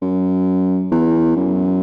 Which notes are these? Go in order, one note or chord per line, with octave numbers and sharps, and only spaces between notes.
F#2
E2
F#2